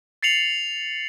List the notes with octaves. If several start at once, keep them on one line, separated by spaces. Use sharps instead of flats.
A6 C7 C#7 F7 F#7